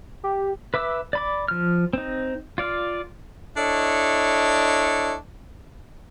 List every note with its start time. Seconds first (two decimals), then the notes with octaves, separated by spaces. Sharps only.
0.24 G4
0.74 B4 E5 D6 E6
1.13 D5 B5 D6
1.48 F3 F6
1.93 C4 D#4
2.58 F4 D5 F5
3.56 D4 E4 A4 C#5 D#5